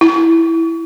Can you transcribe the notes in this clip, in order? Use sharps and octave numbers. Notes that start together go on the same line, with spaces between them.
E4